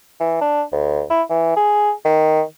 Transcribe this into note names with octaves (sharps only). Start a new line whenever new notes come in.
E3
D4
D2
E4
E3
G#4
D#3